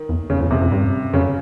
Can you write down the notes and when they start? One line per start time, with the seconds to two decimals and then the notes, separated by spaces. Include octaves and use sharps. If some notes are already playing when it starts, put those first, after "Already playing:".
Already playing: D#3
0.09 E2
0.30 E2 C#3
0.40 F2
0.51 E2 C3
0.62 F2
0.72 G2
1.13 F#2 C#3